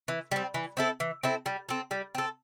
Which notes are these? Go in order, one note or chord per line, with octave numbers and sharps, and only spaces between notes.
E3
G3 C4
E3
C4 E4 A4
E3
C4 E4 A4
G3
C4 A4
G3
C4 A4